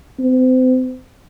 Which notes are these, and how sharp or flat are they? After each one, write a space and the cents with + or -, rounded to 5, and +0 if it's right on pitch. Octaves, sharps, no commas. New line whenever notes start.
C4 -35